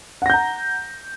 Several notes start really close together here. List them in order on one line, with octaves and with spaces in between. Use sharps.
F#5 A#6 G6 A#5